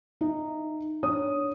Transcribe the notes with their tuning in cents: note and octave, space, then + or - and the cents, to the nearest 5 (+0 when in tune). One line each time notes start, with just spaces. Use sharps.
D#4 -15 E5 +0
D4 +0 C#5 +5 D#6 +0